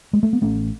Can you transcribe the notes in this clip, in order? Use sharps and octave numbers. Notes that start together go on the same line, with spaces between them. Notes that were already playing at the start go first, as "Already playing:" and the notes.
G#3
A3
B3
A1 A3 C#4